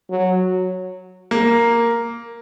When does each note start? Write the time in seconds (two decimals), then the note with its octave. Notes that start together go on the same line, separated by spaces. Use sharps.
0.10 F#3
1.31 A#3